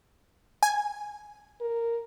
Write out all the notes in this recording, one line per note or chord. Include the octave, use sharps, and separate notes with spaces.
G#5
A#4